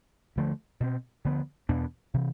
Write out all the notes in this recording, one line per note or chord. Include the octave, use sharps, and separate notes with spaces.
D2 D3 F3 A3
B2 A3 C4
D2 D3 F3 B3
E2 B2 B3 D4
C3 E3